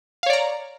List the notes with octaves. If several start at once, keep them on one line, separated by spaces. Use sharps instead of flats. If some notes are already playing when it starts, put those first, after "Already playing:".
C#5 D5 F5 A#5